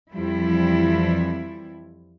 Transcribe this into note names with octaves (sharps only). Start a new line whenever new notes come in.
F2 E3 F3 G3 E4